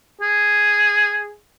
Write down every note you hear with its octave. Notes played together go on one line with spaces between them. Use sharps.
G#4